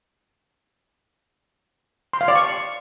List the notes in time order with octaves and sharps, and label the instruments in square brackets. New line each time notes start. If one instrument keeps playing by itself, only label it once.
[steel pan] C6
F5
D5
C#6